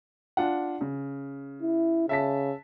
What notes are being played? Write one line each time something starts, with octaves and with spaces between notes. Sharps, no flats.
D4 F4 F#5
C#3
E4
C#3 E5 A5 B6